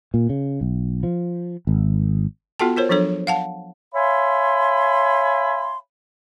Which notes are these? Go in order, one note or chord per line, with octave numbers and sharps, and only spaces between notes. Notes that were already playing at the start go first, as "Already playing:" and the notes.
A#2
C#3
B1
F3
G#1
B3 F4 F#4 A4 G5 A5
F4 A#4 C5 C#5
F3 F#3 D4 A4 C#5
F5 F#5 A5
C#5 E5 F5 G#5 B5 C6